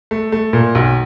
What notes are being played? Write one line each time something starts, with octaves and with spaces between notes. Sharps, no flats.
A3
A3
A#2
B1